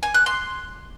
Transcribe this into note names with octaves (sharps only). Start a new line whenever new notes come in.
G#5
F#6
C6